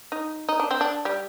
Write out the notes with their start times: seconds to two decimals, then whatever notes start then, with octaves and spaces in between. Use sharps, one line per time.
0.12 D#4
0.49 D#4
0.60 D4
0.71 C4
0.81 D4
1.05 G3